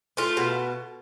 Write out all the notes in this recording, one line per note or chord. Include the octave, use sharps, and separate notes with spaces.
A3 F4
B2